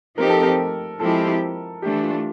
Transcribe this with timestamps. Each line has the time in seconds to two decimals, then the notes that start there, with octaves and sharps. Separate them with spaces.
0.17 F3 A3 C4 D#4 G4 A#4
0.29 A4
0.42 A#4
1.00 F3 G#3 C4 E4 G4 A4
1.82 E3 A3 D4 G4
2.03 F4